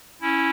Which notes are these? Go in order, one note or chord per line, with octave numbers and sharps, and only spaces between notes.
C#4 E4